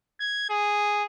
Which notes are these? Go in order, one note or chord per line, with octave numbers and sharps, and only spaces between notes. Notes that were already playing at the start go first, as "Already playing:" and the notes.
G#6
G#4